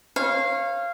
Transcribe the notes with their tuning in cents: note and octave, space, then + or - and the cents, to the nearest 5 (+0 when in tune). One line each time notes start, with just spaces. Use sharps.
C#5 -30 F5 -15